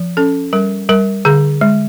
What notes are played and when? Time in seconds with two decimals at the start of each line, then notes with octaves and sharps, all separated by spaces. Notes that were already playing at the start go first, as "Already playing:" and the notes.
Already playing: F3
0.17 C#4 A4
0.53 G3 A#4
0.89 G3 A#4
1.25 D3 G#4
1.61 G#3